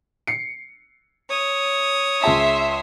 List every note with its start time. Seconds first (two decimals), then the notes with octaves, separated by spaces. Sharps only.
0.27 C7 C#7
1.28 C#5 D#6
2.24 C#2 G#4 E5 A5 C6